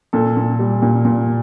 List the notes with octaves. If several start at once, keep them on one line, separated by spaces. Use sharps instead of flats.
A#2 A4
A#2
G3
A#2
A#2